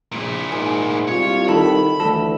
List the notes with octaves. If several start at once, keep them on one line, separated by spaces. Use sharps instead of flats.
A#1 A#2 E4
G#2 A#3 G#5
C2 F4 C#5
D#3 A4 B5
D2 E3 A4